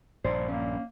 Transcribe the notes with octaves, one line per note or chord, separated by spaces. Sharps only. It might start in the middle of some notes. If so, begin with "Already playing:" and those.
A#1 G2 A#2 C5 D5
A#3 C#4